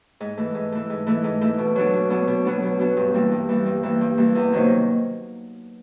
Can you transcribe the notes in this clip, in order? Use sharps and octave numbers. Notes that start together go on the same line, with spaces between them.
G#2
E3 A3
G#2
E3 A3
G#2
E3 A3
G#2
E3 A3
B2
F#3 B3 D4
B2
F#3 B3 D4
B2
F#3 B3 D4
B2
F#3 B3 D4
G2
E3 G3 A#3
G2
E3 G3 A#3
G2
E3 G3 A#3
G2
E3 G3 A#3
E2
C3 D#3 F#3 A#3